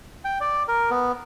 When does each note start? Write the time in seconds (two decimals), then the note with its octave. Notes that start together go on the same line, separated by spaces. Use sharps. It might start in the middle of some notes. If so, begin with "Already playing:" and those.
0.25 G5
0.41 D5
0.68 A#4
0.91 B3